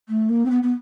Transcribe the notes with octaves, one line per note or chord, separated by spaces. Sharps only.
A3
A#3
C4
B3
B3